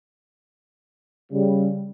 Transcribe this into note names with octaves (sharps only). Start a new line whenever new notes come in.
C#3 G3